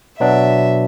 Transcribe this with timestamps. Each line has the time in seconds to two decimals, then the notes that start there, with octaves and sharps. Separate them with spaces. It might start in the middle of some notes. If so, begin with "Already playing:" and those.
0.19 B2 F#3 B3 D4 E5